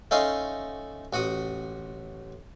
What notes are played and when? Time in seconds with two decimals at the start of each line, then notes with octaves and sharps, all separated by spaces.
0.11 A3 C#4 D#4 D#5 F5 C6
1.13 A1 F#4 F#5 D#6